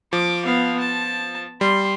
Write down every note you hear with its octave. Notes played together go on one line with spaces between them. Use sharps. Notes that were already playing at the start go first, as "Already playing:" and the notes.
F3 D6
B3 F5
A5
G3 C6